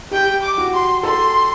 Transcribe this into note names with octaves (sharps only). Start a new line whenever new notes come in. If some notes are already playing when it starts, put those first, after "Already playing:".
G4 G5
D6
F#4
C6
A4 C6